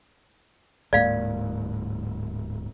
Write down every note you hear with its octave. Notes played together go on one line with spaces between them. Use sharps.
D1 G#2 A#3 D5 F5